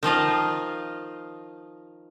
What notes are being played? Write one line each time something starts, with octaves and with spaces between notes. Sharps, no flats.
D#3 F3 F4 D#5